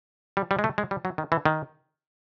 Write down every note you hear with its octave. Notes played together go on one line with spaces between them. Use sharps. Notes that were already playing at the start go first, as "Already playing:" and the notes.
G3
G3
G#3
A3
G#3
G3
F#3
D#3
E3
D#3